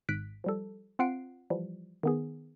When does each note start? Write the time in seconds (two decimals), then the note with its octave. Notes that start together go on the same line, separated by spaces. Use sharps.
0.09 G#1 G#2 F#6 B6 D7
0.44 F3 G3 A4
0.99 C4 F4 F#5 C7 D7
1.50 E3 F3 G3
2.03 D#3 B3 G#4